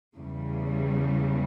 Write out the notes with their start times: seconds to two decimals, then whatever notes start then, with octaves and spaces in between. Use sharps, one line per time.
0.17 E2 C#3 G3